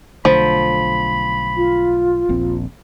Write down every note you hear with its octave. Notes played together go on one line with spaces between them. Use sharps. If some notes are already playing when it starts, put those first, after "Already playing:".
B1 D3 F3 A3 B5
F4
D#1 A#1 C4